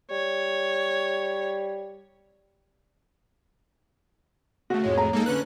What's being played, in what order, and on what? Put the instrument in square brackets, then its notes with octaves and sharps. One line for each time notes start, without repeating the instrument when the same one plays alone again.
[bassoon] G3 [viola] C#5
[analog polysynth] C#3 A3 [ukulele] F#4
[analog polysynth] F2 A2 G#3 [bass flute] C#5
[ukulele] A#5
[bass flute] G#3 [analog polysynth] A#3 D#4 A4
[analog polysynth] D3 C#4 F#6 [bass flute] B4